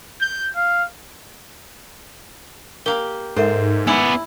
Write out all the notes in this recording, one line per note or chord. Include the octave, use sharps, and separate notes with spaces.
G6
F5
A#3 G4 A#4 G7
G#2 A4 A#4 C5 E5
B3 E4 D5 G#5